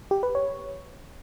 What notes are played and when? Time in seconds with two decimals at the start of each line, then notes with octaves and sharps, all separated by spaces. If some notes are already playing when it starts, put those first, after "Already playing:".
0.11 G4
0.23 B4
0.35 C#5